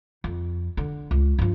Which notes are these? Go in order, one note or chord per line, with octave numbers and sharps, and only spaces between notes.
F2
D3
C#2
G2 F3